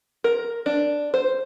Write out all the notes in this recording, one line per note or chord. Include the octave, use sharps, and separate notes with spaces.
A#4
D4
C5